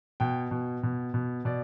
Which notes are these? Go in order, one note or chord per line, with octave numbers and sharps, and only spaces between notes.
B2 G5
B2
B2
B2
B2 D5